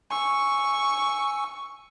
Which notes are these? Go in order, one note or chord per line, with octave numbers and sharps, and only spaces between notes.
G#5 C#6 E6